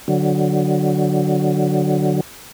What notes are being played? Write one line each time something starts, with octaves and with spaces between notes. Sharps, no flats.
D3 F#3